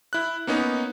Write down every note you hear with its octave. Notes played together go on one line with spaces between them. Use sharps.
E4 F#6
A#3 B3 C#4 D#4